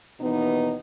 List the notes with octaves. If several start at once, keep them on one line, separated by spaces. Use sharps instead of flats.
D#2 B2 E3 B3 D#4